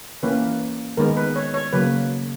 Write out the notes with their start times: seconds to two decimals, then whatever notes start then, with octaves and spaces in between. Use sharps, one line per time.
0.23 E3 A#3 C#4 B4
0.97 D#3 G#3 B3 A#4
1.17 B4
1.36 C#5
1.54 C#5
1.73 C#3 F#3 A#3 B4